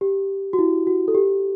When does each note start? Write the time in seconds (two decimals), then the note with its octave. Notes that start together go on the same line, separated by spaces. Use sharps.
0.01 G4
0.53 F#4
0.58 E4
0.87 F#4
1.08 A4
1.15 G4